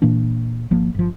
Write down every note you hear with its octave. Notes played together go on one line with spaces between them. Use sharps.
A#2 E3 A#3 D4
G#1 F3 A#3
G1 F3